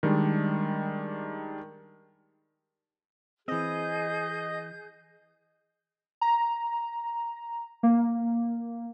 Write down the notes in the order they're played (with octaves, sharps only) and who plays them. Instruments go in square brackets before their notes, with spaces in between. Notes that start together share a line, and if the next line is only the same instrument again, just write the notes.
[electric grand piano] D#3 G3 G#3 D4
[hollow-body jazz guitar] E3 C4 [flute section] G#4 G6 [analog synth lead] D#5
[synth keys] A#5
A#3